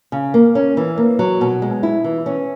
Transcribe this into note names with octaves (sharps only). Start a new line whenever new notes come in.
C#3
A#3
C#4
E3
A#3
F#3
B2
G#3
E4
E3
C#4